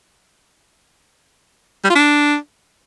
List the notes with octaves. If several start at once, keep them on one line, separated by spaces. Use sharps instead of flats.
G3
F4
D4